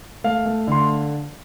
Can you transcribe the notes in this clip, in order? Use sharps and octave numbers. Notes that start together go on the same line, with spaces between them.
A3 F5
A3
D3 C6